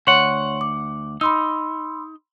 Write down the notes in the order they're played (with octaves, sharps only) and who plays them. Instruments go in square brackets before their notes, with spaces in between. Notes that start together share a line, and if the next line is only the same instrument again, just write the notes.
[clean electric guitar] D2 F#5 [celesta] C#5 C6 C#6
[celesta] D6
[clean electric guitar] D#4 [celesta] B5 C6 E6